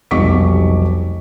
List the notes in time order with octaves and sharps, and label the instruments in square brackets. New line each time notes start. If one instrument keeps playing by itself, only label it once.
[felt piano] F1 B1 G3 C#6 D6 B6